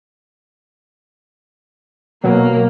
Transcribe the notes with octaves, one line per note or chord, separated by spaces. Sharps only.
B2 F#3 A#3